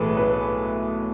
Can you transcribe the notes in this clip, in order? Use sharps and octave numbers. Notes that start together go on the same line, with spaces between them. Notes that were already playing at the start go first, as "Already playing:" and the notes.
Already playing: B1 A2 E3 B3 G#4 A4 B4
B4